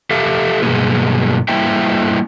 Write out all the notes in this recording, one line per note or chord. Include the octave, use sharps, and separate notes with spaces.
G4 A4 E5 F5
G2 B2 D#3 F#3 A#3 G#4
G3 A#3 E4 C5 E5 G5